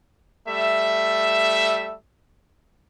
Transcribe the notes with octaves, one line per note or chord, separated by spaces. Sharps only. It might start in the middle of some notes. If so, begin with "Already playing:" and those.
G3 A3 E5